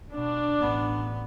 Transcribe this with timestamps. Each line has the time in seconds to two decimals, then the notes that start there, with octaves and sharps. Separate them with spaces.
0.13 B2 D4
0.60 A1 B3